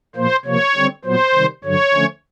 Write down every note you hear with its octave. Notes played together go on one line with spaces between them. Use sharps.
A#2 F3 A#3 C5
C3 F3 A#3 C#5
D3 G3 C4
A#2 F#3 B3 C5
C3 D#3 G3
G2 D3 F#3 C#5
D3 F3 A3 C#4